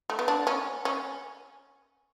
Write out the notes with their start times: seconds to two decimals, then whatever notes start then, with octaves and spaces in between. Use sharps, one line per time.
0.10 A3
0.19 B3
0.28 D4
0.47 C#4
0.85 C#4